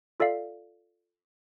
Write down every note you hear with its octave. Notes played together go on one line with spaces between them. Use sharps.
F4 A4 D5 E5 F5